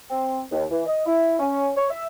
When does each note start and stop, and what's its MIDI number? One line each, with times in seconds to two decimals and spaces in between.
0.10 0.41 60
0.51 0.64 39
0.71 0.83 52
0.86 1.02 75
1.06 1.38 64
1.39 1.69 61
1.77 1.90 73
1.90 2.07 76